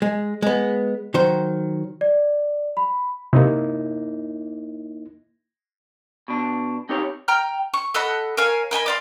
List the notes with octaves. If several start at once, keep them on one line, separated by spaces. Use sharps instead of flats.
G#3
G#3 B3
D#3 F#3 C5
D5
B5
C3 A#3 D#4 E4
B2 D4
C4 D#4 G4 A#4 C#5
G5 A#5 F6
C#6
A4 D#5 F#5 B5
A#4 C#5 F5 G#5
A#4 D#5 G#5 B5
D5 F5 C6